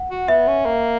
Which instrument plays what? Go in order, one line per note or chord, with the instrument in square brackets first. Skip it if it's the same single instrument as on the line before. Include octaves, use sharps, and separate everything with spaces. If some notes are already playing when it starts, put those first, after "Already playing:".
Already playing: [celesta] F#5
[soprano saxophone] F#4
[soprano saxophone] B3 [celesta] E5
[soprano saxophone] C#4
A#3